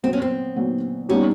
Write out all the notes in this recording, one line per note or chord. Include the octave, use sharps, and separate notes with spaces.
A#2 F#3 B3 C4
C#4
C4
A#2 F#3 B3
A#2 G3 B3 C#4 D#4 G4